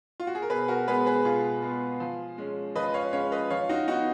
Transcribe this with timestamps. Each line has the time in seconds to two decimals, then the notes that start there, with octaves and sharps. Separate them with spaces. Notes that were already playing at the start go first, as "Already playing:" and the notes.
0.20 F4
0.27 F#4
0.35 G#4
0.42 A#4
0.50 B2 G#4 B4
0.68 F#4 A#4
0.87 G#3 B3 G#4 B4
1.06 G#4 B4
1.25 B2 F4 G#4
1.63 G#3 B3
2.00 F3
2.38 G#3 C#4
2.75 F3 B4 D#5
2.86 D#5
2.94 C#5 F5
3.13 G#3 C#4 C#5 F5
3.32 B4 D#5
3.50 F3 C#5 F5
3.69 D#4 F#4
3.88 B3 D#4 F#4